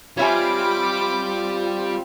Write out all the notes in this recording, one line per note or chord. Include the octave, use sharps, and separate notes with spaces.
G3 C4 F4 C#5 E5 G#5 B5 D6